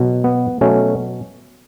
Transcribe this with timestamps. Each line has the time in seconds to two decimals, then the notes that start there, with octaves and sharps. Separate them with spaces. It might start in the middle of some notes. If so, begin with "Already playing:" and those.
Already playing: B2 F#3
0.24 B3
0.61 B2 F#3 A3 C#4